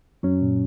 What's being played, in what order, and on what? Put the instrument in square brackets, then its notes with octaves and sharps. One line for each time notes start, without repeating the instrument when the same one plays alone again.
[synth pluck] F#2 F#3 [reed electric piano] C#4
[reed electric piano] A#2